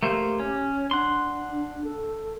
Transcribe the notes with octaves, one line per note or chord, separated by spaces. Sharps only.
A3 A#3 G4 C5
C#4
D4 F#5 C6
A4